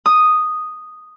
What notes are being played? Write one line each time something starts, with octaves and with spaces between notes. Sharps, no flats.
D#6